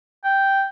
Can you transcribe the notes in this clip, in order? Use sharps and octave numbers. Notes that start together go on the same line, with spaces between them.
G5